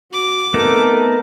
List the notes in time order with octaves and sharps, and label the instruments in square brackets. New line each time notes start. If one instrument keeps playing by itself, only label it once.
[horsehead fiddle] F#4 [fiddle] D6
[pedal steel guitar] A3 B3 D#4 [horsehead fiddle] C4 A4 [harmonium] A#4